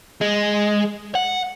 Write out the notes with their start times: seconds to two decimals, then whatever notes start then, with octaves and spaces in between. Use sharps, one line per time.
0.21 G#3
1.15 F#5